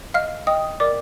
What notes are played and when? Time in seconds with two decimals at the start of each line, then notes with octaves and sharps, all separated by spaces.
0.14 D#5 F5 F6
0.47 D#5 G5 D#6
0.80 A#4 D5 D6